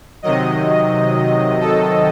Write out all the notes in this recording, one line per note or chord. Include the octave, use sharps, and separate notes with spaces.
C3 D#3 F#3 D#5
A4